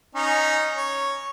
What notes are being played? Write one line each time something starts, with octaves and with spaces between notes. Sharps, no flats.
C#4 D#4
C#5